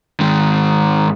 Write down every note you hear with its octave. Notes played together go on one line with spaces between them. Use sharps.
G#2 D#3